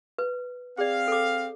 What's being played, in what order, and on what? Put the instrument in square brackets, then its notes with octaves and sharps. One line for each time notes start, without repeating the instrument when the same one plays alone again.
[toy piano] B4
[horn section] C4 F5 [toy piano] G#4 D5
[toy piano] A4 D6